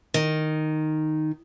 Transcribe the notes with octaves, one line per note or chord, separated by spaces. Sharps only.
D#3